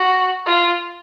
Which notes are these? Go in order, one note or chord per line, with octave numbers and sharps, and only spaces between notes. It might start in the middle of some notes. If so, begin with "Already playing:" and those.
Already playing: F#4
F4